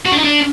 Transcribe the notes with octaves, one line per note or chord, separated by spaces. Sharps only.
F#4
D4
D#4
D4